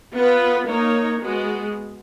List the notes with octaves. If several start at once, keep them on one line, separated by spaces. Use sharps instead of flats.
B3 F4 B4
A#3 D#4 A#4 C#5
G#3 B3 F#4